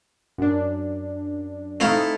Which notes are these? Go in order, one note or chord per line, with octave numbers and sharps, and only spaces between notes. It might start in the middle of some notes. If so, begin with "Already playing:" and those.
F#2 D4
A3 C4 D#4 E4 F5